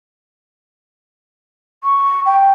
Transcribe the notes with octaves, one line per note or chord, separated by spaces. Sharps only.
C#6
G5